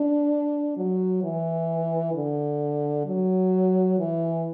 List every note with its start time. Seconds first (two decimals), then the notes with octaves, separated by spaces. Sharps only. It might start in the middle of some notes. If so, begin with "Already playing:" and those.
Already playing: D4
0.77 F#3
1.23 E3
2.14 D3
3.06 F#3
3.99 E3